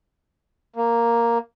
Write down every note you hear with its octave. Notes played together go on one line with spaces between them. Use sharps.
A#3